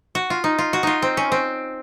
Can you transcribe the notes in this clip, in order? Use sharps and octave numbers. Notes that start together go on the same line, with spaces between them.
F#4
F4
D#4
F4
F#4
D#4 F4
C4
C#4
C4